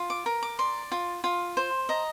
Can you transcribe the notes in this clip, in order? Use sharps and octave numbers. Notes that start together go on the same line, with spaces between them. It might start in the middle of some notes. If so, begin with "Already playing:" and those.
Already playing: F4
D6
A#4
D6
D5 C6
F4
F4
C5
D#5 A#5